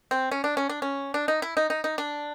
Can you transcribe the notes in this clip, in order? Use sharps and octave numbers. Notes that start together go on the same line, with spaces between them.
C4
C#4
D4
C#4
D4
C#4
D4
D#4
E4
D#4
D#4
D#4
D4